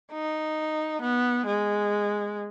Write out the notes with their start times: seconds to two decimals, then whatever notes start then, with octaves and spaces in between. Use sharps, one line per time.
0.13 D#4
1.02 B3
1.46 G#3